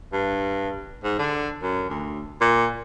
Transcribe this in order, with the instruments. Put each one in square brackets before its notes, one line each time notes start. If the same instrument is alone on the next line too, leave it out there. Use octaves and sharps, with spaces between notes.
[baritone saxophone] G2
G#2
D3
F#2
D2
A#2